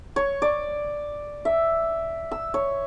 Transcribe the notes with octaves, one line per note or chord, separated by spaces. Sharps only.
C#5
D5
E5
E6
C#5